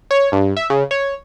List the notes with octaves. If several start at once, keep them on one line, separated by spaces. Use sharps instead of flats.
C#5
G2
E5
C#3
C#5